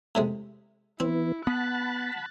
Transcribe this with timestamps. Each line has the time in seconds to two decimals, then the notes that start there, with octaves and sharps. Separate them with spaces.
0.15 A2 C3 G#3
1.00 E3 B3 C4 E4
1.47 B3 F#5 A5 B5 F#6 A6